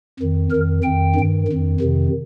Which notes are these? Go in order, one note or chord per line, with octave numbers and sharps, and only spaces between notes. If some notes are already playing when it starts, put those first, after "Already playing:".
F2 D#3
F2 D#3 A#4
F2 D#3 G5
G2 D#3
F2 D#3
F2 C3 D#3